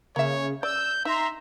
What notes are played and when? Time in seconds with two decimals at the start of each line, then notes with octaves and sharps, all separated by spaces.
0.16 C#3 A#3 C#5 E5
0.63 D5 E6 G6
1.05 D#4 E5 A#5 C6